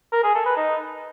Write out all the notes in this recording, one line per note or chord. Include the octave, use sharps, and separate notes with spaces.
A#4
G#4
A4
B4
D#4